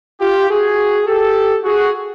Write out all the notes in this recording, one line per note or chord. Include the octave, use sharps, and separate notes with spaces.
F4 G4
F#4 G#4
G4 A4
F#4 G#4